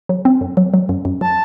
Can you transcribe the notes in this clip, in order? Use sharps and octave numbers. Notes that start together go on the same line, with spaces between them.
F#3
C4
F#2
F#3
F#3
F#2
F#2
F#3 A5